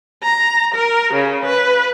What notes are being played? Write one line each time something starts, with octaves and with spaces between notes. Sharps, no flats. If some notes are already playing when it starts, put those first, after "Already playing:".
A#5
A#4
C#3
B4